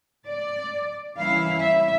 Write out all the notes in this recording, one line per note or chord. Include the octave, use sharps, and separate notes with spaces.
D5
E3 G3 A#3 C#4 E4 F5
E5